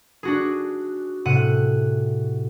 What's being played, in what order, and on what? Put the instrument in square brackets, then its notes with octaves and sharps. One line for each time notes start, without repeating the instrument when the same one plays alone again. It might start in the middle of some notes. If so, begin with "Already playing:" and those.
[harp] D4 F#4 G#4
A2 C3 F#5 D#7